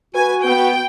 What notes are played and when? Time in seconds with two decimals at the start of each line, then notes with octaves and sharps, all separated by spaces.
0.15 F#4 B4 G#5
0.44 B3 G5